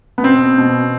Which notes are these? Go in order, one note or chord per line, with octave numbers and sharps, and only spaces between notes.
B3
B2 C4
B2